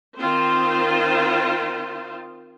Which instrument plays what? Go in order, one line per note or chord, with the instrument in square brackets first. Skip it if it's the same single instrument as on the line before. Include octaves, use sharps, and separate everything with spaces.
[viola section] D#3 C4 F4 C5